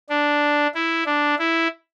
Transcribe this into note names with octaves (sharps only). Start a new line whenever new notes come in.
D4
E4
D4
E4